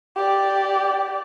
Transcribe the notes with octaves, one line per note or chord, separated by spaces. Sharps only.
G4 D5